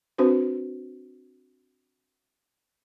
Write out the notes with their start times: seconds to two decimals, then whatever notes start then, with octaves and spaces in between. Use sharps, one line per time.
0.18 C4 D4 F#4 B4 C5